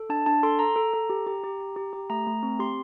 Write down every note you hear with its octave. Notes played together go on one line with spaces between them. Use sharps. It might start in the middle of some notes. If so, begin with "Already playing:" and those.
Already playing: A4
D4 A5
D4 A5
A4 C6
A4 A#5
A4
A4
G4
G4
G4
G4
G4
G4
A3 A#5
A3
C4
G4 C6